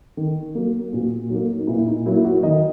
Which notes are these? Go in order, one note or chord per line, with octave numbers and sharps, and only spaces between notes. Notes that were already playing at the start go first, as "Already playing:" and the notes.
D#3
F#3 A#3
A#2 F#4
F#3 A#3 D#4
D#4
A#2 E4
D#4
F#3 A#3 E4
F#4
D#3 D#5